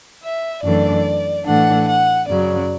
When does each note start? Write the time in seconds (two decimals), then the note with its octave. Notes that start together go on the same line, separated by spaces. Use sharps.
0.23 E5
0.64 F#2 E3 A3 D4 D5
1.46 A2 E3 A3 D4 F#5
1.87 F#5
2.28 F#2 C#3 F#3 D5